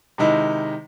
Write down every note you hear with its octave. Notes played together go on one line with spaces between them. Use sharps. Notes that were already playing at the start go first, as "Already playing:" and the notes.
C3 D#3 G#3 D#4 E4